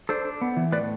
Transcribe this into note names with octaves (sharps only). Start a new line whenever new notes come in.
D4 A4 C5
D4
B3
E3
A2 B4 D5